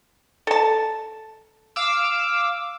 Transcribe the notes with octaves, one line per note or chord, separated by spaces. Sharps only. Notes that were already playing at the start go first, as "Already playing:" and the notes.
A4 A5
F5 D6 E6